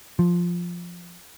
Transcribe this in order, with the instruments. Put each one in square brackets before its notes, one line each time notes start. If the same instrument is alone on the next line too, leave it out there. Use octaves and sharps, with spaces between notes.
[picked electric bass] F3